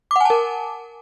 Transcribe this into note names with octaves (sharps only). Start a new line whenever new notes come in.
A#4 F#5 G#5 A5 D6